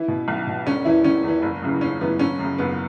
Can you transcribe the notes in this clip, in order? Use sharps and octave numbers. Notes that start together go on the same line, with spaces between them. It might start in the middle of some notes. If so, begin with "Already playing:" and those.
Already playing: E3 E4
B2
B1
B2
E1 C#4
E2 E3 E4
E1 C#4
E2 E3
F#1
F#2 C#3 E3
F#1 C#4
F#2 C#3 E3 B3
F#1 C#4
F#2 C#3
F#1 B3